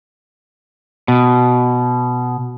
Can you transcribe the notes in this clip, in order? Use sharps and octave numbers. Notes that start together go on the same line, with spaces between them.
B2